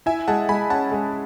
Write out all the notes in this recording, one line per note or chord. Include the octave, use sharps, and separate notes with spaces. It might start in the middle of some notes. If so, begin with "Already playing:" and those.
E4 E5 G#5
G#3 F#5 A5
G#3 G#5 B5
C#4 F#5 A5
G#3